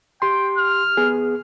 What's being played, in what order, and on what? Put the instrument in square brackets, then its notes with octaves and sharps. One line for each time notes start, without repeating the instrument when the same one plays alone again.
[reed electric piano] G4 C6 [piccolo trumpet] G5
[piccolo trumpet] F6
[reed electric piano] B3 G#4